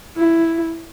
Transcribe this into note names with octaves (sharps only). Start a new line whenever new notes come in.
E4